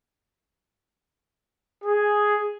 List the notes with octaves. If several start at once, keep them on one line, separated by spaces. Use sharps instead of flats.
G#4